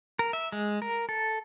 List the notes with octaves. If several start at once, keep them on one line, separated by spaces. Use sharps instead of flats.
A#4
E5
G#3
A#4
A4